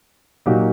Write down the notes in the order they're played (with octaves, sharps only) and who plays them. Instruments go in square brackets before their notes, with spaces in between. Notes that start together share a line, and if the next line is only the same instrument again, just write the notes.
[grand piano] A#2 F#3 A#3 D#4 G4